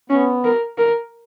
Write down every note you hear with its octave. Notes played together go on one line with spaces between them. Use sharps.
B3 C#4
A#4
A#4